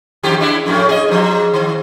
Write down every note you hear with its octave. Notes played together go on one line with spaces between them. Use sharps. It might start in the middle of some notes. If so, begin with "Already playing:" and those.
F2 D#3 G4
G#3 D4 E4
F2 A2 C#4
G#4 D#5
G#2 F3
D#3